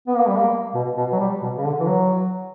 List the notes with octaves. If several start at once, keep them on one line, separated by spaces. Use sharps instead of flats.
B3
A#3
G3
A#3
B2
B2
F#3
G3
B2
C#3
D3
E3
F#3